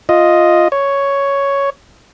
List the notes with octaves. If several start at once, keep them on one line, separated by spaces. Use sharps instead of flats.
F4 D#5
C#5